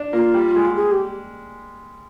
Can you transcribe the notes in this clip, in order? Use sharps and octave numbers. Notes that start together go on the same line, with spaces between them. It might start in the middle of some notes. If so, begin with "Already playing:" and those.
Already playing: D4
A#3 F4
G3
G#3
G#4
G4